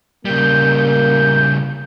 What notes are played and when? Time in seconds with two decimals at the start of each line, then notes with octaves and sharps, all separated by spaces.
0.25 C#3 G3 A#3 G6